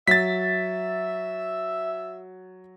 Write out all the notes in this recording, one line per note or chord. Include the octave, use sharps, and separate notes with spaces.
F#3 E5 A6 B6